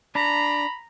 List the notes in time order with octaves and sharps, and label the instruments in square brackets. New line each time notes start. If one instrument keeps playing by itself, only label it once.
[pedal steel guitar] D4 [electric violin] A#5 [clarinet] B5